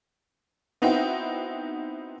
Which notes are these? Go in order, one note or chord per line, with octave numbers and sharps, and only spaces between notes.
B3 C4 D#4 E4 F#4 G5